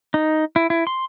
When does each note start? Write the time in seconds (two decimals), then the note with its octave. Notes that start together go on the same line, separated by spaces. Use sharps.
0.14 D#4
0.56 E4
0.70 E4
0.87 C6